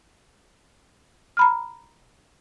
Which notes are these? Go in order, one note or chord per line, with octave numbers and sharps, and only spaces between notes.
A#5 B5 F6